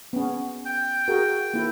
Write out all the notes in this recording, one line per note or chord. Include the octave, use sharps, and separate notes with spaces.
B3 C#4
G5
F#4 G#4 A#4
A#3 E4